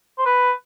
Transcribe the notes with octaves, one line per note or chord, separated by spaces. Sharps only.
C5
B4